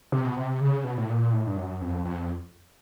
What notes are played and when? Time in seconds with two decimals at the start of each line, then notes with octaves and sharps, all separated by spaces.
0.12 C3
0.25 B2
0.37 C3
0.61 C#3
0.84 B2
0.98 A2
1.09 A#2
1.33 A2
1.47 G2
1.57 F#2
1.81 F2
2.05 F2